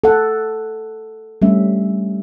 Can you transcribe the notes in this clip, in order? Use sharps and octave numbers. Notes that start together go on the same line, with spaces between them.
A4 F#5
G3 A3 C#4 E5